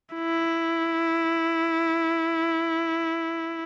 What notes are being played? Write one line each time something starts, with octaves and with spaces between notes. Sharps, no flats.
E4